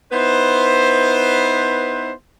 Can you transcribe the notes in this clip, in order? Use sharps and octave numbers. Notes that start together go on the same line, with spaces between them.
B3 D#4 E4 B4 C5